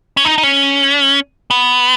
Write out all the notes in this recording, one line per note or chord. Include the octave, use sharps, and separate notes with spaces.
C#4
D#4
D#4
C#4
B3